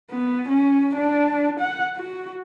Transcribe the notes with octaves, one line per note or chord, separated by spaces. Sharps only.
B3
C#4
D4
F#5
F#4